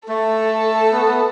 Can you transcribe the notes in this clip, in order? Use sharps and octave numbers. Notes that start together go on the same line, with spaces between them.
A3 A4
B3
B3